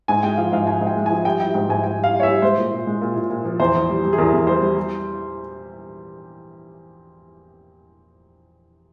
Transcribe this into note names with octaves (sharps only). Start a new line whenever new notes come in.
G#2 G#5
G#3 G5
F3 F5
G#2 F5
F3 G#5
G#2
G5
G#3
F3 G#5
G3 G5
G3 G5
G#2 G5
G#2 G#5
G#2 G5
G3
F5
G3
C#5
E5
G3
G#3 C5
A#2
A#2
G#3
A#2
A#2
A#2
F3
E2 C5
E2
G3
G3
G#4
E2 A#4
E2
G3 C5
G3
G3